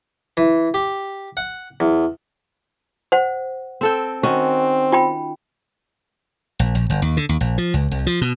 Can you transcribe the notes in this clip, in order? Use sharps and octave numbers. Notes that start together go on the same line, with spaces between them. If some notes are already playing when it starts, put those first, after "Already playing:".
E3
G4
F#5
E2
C5 F#5
C4 A4 G5
D#3 C4 C#4 F#4
F4 G5 B5
A#1
A#1
G1
D#2
D3
D#2
A#1
F3
C#2
C2
F3
B2